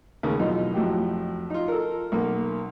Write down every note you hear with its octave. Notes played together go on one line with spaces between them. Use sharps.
D#2 C#3 A3 A#3
F#2 B2 E3 F3 D#4 F4
F2 A2 F#3 G4
D#4 F4
A4 A#4
B1 F#2 A#3